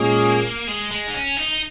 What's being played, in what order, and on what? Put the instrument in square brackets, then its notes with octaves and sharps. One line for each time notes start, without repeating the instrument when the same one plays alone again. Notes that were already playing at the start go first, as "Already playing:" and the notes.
Already playing: [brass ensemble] A#2 G#3 C#4 G#4 [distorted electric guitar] A#3
[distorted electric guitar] G#3
G#3
D#4
C#4
D#4